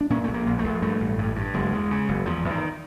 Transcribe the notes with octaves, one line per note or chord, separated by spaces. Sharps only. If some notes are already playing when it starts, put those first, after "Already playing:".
D4
A#2 C#4
A#1 A3
A#3
A#1
A3
A#1
G2 A3
A1
G2
G2
F#1 G#3
E2
C#3
F#1
E2 F3
E2
D#3